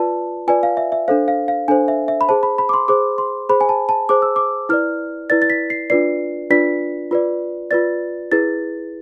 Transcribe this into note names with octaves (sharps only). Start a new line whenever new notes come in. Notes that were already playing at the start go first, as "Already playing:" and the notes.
Already playing: F4 B4 D5 A5
F4 B4 D5 G#5
F5
E5
E5
D4 A4 C5 F5
F5
F5
D4 A4 C5 G#5
E5
E5
B5
G#4 C5 A5
B5
B5
D6
C6
G#4 C5 D6
C6
G#4 C5 B5
G#5
A5
A5
G#4 C5 D6
E6
D6
E4 B4 D5 F6
E4 B4 D5 A6
A6
B6
C7
D4 F4 B4 D5 C7
D4 F4 B4 D5 B6
F4 B4 D5
F4 B4 D5 A6
E4 G#4 B4 A6